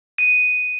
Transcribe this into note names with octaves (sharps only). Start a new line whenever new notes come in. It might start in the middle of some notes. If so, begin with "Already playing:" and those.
D#7